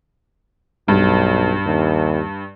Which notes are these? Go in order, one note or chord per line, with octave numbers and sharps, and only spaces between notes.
B1 G2
D#2